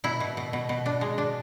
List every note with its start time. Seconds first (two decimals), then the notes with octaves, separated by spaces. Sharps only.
0.04 B2 E4
0.20 B2
0.37 B2
0.53 B2
0.69 B2
0.86 D4
1.01 G#3
1.18 D4